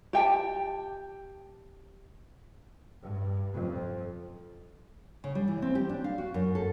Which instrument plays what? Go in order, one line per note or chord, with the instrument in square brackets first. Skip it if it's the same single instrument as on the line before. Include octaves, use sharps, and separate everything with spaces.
[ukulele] G4 G5 A5
[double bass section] G2
F2
[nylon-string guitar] C#3
G3
E3
C4
G4
D4
F5
F#4
F#2
A4